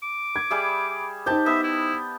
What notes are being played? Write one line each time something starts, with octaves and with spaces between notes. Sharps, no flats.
D6
G#6
G3 G#4 E5
D#4 G4 C5 G5 A5
B3 E5
E4